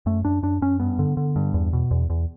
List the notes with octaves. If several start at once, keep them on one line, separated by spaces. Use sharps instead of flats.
F#2 A3
F#2 D4
F#2 D4
F#2 C#4
G2 B3
D3
D3
G2
E2
B2
E2
E2